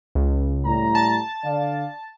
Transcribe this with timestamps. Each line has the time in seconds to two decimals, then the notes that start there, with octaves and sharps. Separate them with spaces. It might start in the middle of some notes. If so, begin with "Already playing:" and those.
0.15 C#2
0.65 A2 G3 A#5
0.95 A5
1.44 D3 D5 F5